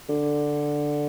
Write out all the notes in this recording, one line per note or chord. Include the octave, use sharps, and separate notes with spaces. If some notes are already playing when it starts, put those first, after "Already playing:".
D3